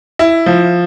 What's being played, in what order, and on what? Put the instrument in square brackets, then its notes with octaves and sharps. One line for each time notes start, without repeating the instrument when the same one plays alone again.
[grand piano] E4
F3